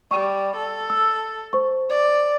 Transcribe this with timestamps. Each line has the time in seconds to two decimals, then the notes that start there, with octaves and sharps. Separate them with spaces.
0.11 G3 C#6
0.57 A4
0.90 E6
1.53 C5 C#6
1.90 D5